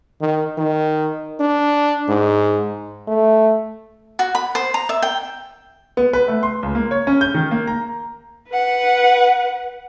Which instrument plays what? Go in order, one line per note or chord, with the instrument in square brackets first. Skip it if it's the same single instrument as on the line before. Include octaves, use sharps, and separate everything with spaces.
[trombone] D#3
D#3
D4
G#2
[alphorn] A3
[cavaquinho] F#4
B5
C5
A#5
E5
G5
[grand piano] B3
B4
A3
C6
C#2
A#3
C#5
C#4
G6
D#3
A#3
A#5
[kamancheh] B4 F#5